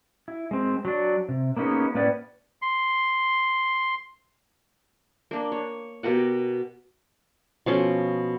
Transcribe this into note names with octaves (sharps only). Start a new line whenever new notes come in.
E4
G#3 C4
F#3 D4
C3
A#3 B3 C#4 D#4 G#4
A2 A#3 B3 C#4 B4 D5
C6
A#3 D4
C#5
B2 G4 A#4 F#5
B2 F3 C#4 A4